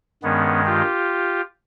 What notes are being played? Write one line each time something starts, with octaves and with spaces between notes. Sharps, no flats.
G2 D#3 G#3 B3 C#4
F4 G4